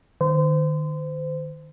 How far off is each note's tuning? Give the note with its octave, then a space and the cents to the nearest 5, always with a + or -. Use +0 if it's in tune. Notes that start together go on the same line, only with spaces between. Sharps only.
D#3 -30 C5 -30